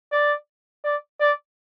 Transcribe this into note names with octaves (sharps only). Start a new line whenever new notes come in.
D5
D5
D5